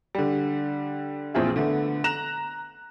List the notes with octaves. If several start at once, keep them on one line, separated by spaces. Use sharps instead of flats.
D3 G3
A#1 E3 C4 F4 G#4 E5
D3 A3 B3
A#5 F#6 A#6 E7 F7